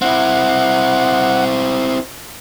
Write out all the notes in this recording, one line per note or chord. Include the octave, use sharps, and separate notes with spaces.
C4 E4 F#5